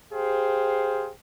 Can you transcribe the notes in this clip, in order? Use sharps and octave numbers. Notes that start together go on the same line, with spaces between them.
G4 G#4 C5 F5 G5